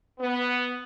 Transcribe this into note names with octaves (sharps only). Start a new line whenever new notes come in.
B3